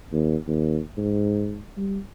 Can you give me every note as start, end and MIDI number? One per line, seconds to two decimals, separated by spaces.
0.12 0.36 39
0.47 0.80 39
0.97 1.62 44
1.77 1.98 55